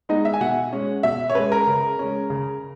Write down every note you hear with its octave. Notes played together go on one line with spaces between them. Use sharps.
G#3 B3 D#4 D#5
E5
G#5
B2 F#5
G#3 C#4
B2 E5
C#5
G#3 C#4 B4
A#4
C#3
G#3 C#4
C#3